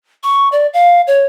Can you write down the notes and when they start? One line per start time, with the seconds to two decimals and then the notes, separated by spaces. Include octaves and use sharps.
0.23 C#6
0.52 D5
0.73 F5
1.07 C#5